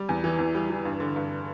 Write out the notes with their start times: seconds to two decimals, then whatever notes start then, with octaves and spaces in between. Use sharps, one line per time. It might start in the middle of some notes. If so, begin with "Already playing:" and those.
Already playing: G3
0.09 E2
0.24 E3
0.39 E2
0.55 G3
0.70 E3
0.85 G2
1.00 D3
1.16 G2